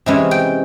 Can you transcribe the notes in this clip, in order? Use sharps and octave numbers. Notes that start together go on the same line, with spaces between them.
C3 E3 G#3 C#4 E4
G5